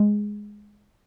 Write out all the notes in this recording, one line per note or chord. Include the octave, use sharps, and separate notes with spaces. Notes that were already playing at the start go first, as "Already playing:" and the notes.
Already playing: G#3